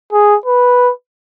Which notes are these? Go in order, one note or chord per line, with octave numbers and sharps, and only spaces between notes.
G#4
B4